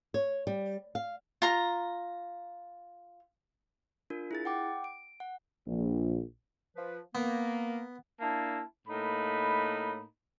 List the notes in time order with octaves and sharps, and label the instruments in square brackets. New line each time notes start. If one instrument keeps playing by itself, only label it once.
[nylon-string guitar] C#5
G3
F5
[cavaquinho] F4 A#5
[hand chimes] D4 F4 A#4
E4 G#4 A6
F#5 G5 D6
D7
F#5
[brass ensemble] A#1
[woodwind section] F3 B4
[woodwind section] A#3 [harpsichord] B3
[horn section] A#3 D4 E4 A5
A2 A#3 D#4 B5